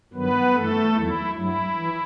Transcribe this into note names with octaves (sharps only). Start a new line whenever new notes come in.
G2 D#3 F#3 B3 B4
G2 E3 A3 A4
E2 D#3 F#3 E4
G2 F#3 E4
E3